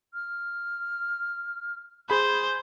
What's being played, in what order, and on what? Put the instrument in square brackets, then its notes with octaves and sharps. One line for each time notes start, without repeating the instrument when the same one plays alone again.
[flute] F6
[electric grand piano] G#4 B5 [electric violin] C5